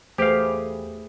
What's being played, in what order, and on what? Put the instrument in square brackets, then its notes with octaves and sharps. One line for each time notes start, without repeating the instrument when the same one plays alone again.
[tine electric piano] E2 [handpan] A3 G#4 B4 [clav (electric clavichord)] G4 F5 [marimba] C5